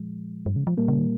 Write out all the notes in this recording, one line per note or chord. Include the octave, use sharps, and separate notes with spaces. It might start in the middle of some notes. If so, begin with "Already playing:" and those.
Already playing: A#2 F3 G#3
G2
C#3
F3
A#2 G3 A#3
C#3
D#3